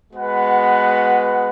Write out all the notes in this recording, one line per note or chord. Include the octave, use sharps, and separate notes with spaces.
G#3 B3 F#4 B4 F#5